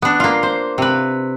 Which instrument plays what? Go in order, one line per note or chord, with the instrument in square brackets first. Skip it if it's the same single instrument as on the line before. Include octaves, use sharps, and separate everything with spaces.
[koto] B3 D4
A#3 F4
C5
C3 B4